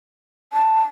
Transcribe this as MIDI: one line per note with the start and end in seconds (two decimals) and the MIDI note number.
0.53 0.82 81